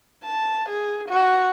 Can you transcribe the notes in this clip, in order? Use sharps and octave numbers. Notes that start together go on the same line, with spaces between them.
A5
G#4
F#4